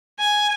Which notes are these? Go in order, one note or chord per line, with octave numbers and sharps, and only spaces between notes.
G#5